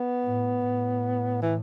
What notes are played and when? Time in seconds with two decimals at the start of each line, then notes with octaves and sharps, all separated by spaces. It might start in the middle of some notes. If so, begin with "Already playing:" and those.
Already playing: B3
0.25 A2
0.68 A2
1.42 E3